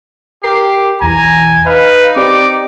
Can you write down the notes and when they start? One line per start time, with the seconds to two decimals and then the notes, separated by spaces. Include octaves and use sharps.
0.43 G4 A#4 C7
1.01 B1 E2 G#5 A#5
1.66 D#4 B4 F5
2.16 C4 G4 D5 D6